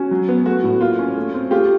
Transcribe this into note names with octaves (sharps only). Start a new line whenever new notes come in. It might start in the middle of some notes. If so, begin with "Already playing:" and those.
Already playing: C#4 F#4
F#3
B3
A3 F#4
A2
A#3 F4
C#4
A3
C4
A3 F4 G4